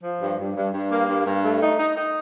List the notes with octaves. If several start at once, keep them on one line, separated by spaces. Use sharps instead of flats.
F3
G2
G2
G2
G2
A#3
G2
G2
A3
D#4
D#4
D#4